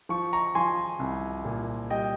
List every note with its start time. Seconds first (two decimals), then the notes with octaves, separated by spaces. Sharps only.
0.09 F3 C#6
0.33 A#5 C#6
0.55 F3 G#5 C6
0.99 C2
1.45 A#2
1.90 G3 D#5 G5